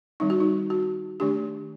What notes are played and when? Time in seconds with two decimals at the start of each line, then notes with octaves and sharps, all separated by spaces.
0.20 D#3 G3 C4 D#4
0.30 F#4
0.40 D#4
0.70 F#4
1.20 D#3 A3 D4 G4